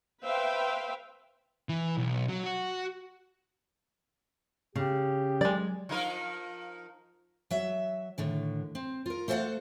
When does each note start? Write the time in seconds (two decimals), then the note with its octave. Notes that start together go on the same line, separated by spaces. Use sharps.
0.23 B4 C5 E5 F5 G5
1.69 E3
1.97 B1
2.29 F#3
2.44 F#4
4.75 C#3 G4
5.41 F#3 G#3 D5
5.89 F3 D#4 A#4
7.51 F#3 E5
8.18 A2 D3 D#3
8.75 C4
9.06 F4 A#4
9.28 A3 A4 C5 D#5 F5 F#5